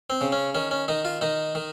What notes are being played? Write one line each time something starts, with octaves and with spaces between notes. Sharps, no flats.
C4
C#3
C#4
D#3 C#4
C#4
D#3 D#4
F4
D#3 D#4
D#3